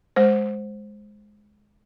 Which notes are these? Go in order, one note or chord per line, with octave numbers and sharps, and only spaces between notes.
G#3 C5